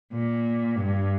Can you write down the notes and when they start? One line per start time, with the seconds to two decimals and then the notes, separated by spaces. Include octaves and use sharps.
0.13 A#2
0.76 G2